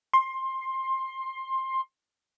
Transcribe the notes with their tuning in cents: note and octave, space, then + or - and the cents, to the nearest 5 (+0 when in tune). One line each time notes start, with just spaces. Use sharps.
C6 +15